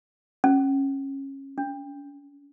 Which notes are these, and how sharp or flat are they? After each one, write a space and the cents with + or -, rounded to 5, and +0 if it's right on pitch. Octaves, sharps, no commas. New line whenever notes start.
C#4 -25
C#4 +45